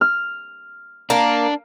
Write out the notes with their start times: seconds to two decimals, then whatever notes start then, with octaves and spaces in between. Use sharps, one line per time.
0.01 F6
1.10 A#3 D4